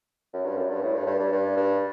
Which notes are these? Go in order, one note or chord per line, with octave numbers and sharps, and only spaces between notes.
F#2
G2
F#2
G2
A2
G2
G2
G2
G2
G2